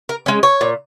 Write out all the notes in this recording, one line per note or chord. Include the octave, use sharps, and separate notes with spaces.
A#4
G#3 C#4
C#5
A#2